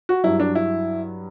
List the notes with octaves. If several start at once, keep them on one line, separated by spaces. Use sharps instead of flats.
F#4
G2 F#3 E4
D4
E4